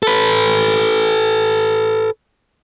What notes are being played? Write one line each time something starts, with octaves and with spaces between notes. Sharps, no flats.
A4 B4